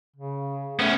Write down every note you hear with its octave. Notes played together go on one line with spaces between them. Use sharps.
C#3
A3 B3 C#4